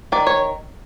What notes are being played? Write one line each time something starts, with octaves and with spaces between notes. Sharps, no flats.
D#3 D5
C#5